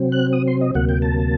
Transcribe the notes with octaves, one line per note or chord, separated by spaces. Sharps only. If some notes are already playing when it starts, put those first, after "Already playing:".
Already playing: C3 F#3 C4
F#6
D#6
C6
D#5
D2 C3 F#3 A#3 F#5
G5
A5